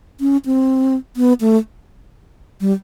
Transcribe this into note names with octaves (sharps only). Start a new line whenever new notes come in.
C#4
C4
B3
A3
G3